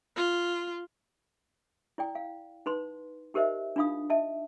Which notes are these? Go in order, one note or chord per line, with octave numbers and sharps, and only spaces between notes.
F4
E4 D5 G5
F5
D#4 B4 C6
D#4 G4 A#4 C5 D#5 E5
D4 D#4 F4 F5 D#6
D#5 E5 A5